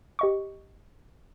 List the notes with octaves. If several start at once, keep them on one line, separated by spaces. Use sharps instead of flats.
G4 D#5 C#6